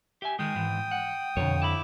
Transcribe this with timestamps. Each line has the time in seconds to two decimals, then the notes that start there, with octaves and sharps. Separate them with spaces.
0.22 G4 E5 G#5
0.39 D#3 G#3 G5 D#6
0.55 G#2 E3
0.91 F#5
1.37 F2 B2 D3 C#5
1.62 E4 A5 B5 D6